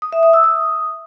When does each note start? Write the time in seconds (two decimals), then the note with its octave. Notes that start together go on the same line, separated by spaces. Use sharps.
0.02 D#6
0.12 E5
0.23 D#6
0.33 E6
0.44 D#6